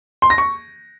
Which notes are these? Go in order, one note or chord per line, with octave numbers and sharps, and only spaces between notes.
C6
A#6
C#6